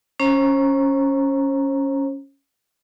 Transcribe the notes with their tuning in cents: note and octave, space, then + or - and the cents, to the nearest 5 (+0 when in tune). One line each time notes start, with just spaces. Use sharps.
C#4 +0 C5 +40 A#5 +0